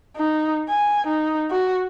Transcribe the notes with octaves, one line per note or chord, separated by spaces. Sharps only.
D#4
G#5
D#4
F#4